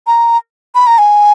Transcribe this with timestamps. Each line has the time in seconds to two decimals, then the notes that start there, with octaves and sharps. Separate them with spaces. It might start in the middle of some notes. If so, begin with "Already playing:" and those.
0.07 A#5
0.75 B5
0.87 A#5
0.98 G#5